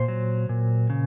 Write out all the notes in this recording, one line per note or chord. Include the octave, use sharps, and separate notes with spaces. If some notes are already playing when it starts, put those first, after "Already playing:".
Already playing: A#2 C5
F#3
A#2
C#3